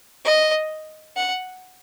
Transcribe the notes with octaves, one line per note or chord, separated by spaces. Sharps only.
D#5
F#5